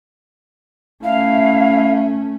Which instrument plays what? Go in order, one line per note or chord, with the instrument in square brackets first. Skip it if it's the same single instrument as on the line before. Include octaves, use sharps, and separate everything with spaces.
[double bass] A3 C#4 [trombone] E4 [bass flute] E5 [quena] F5